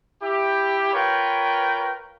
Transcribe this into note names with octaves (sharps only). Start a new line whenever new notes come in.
E4 G4
F4 A#4 B4 C#5 G5